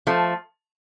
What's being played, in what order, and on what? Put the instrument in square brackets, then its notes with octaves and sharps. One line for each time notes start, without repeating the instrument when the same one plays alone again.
[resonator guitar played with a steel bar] F3 A3